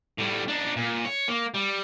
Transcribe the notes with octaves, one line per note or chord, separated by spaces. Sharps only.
A2 G3
D4 D#4
A#2
C#5
A#3
G3